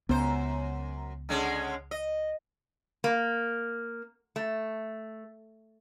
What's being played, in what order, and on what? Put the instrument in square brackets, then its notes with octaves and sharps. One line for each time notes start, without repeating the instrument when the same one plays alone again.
[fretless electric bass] C#2 B3 [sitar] F#2 C5
[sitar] D3 G#3 C#4
D#5
[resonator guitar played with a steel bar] A#3
A3